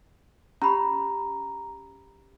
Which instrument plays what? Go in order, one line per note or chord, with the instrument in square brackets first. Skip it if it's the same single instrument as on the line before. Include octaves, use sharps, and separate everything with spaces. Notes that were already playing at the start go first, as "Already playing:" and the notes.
[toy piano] C#4 G4 B5 [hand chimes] A#5